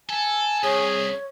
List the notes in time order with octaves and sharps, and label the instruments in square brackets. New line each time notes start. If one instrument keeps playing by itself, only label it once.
[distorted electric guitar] A4 [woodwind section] G#5
[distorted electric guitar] C2 [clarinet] G#4 [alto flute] C#5